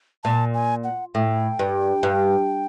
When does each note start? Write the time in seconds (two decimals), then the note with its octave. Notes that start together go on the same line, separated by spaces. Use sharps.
0.24 A#2 A5
0.54 G#5
0.84 F#5
1.14 A2 G5
1.59 G2
2.03 G2